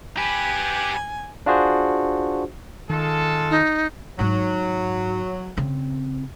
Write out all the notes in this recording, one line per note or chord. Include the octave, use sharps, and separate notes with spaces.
G4 B4 G#5
D4 F4 F#4 G#4 C5
D#3 G#3 F4 A4
D#4
G#2 F#3 D#4
C#3 C4